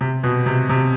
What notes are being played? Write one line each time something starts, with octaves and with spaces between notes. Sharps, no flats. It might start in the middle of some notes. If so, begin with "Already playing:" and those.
C3
B2
C3
C3